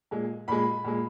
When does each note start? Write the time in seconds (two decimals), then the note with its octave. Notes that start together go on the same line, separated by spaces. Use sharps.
0.11 A#2 G#3
0.48 A#2 G#3 B5
0.84 A#2 G#3